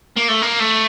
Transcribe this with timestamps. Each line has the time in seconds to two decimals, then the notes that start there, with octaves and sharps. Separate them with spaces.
0.17 A#3
0.29 A3
0.42 A#3
0.60 A3